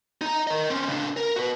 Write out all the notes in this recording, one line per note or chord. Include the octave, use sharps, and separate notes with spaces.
D#4 A#5
A#4 D#5
C4 C#4
C#2 D4
A#4
F#4 B4